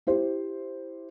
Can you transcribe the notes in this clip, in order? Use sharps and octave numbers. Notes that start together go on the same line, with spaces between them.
E4 G4 C5